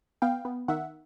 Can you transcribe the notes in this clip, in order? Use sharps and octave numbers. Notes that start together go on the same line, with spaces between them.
B3 F5 G5
B3
D#3 E5 F#5